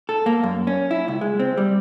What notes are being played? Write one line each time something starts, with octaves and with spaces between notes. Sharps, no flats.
A4
A#3
F#2
C#4
E4
C#2
G#3
C4
G3